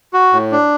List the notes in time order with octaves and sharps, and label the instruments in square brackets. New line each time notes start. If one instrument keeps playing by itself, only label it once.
[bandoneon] F#4
A2
D4